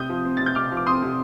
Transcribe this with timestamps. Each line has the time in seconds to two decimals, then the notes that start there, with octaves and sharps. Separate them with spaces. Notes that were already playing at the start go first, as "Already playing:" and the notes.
Already playing: C3 D#6 G6
0.10 F3
0.25 C4
0.37 C3 A6
0.46 G6
0.55 C3 D6 F6
0.72 F3
0.77 D6
0.86 C4 C6 D#6
1.02 C3